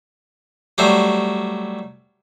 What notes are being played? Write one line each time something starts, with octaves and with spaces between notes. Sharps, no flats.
F#3 G3 A3 C5